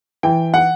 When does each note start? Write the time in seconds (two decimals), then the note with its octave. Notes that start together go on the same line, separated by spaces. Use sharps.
0.23 E3 G5
0.54 F#5